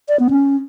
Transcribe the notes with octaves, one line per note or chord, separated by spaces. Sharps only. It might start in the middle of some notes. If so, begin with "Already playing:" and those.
D5
B3
C#4